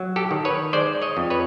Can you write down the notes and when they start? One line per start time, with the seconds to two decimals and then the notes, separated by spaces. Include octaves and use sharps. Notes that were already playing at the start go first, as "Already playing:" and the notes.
Already playing: F#3
0.16 G4 A4
0.31 D#3
0.45 B4 C#5
0.73 G#3 C5 D5
1.02 C#5 D#5
1.17 F2
1.30 B4 C#5